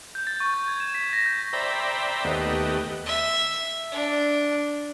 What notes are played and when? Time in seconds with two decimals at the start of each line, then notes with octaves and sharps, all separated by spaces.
0.15 G6
0.27 A6
0.40 C#6
0.54 G6
0.68 G#6
0.80 E7
0.95 B6
1.13 A#6
1.26 G6
1.53 C5 D5 E5 G5 A#5 B5
2.25 D#2 A3 B3 G4 D#5 F#5
3.06 E5
3.92 D4